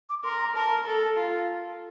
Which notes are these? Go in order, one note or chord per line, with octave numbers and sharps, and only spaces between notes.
D6
A#4 C6
A#5
A#4 A5
A4
F4